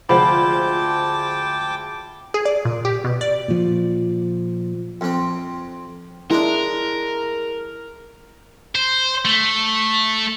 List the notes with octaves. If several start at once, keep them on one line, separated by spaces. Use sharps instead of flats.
D2 F3 G#3 C5 G5 A5 B5 D6
G#4
D5
A#2
G4
B2
D5
A#2 F3
F2 C4
G#3 D4 E4 A#4
C5
A3